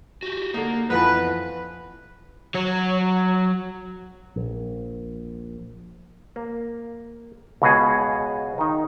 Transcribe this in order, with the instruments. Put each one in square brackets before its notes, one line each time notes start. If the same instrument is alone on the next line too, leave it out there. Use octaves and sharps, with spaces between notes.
[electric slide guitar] F#4 G4
[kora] D3 D#4 [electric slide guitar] A#3
[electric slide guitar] F2 [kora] E3 F3 B3 [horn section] B4
[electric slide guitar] F#3 C#5
[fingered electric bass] A#1
[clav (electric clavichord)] A#3
C#2 B2 F#4 G#4
D#3 D#4